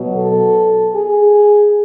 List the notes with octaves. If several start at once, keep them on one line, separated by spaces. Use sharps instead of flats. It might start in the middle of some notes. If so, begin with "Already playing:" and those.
Already playing: B2 F#3
A4
G#4